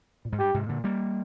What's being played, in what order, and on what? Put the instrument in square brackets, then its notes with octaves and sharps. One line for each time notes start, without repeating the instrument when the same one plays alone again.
[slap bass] A#2
G#2
[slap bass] G2 [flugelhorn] G4
[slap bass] G#2 C3
A#2 D3
G3 A#3